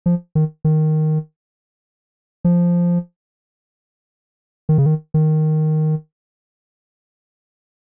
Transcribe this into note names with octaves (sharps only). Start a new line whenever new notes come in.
F3
D#3
D#3
F3
D#3
C#3
D#3
D#3